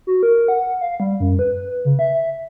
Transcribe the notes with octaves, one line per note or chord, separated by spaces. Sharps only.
F#4
A#4
F#5
F5
G3
F#2
B4
C#3
E5